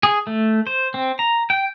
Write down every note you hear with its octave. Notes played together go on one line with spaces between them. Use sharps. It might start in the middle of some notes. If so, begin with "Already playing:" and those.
G#4
A3
C5
C4
A#5
G5